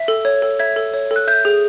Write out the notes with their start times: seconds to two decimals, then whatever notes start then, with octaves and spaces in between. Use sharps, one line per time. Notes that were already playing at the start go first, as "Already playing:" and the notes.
Already playing: E5
0.08 A4
0.25 C#5
0.42 A4
0.59 E5 G#6
0.76 A4
0.94 C#5
1.11 A4
1.16 F#6
1.27 E5 G6
1.45 G#4